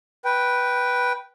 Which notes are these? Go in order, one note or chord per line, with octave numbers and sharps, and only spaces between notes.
B4 G5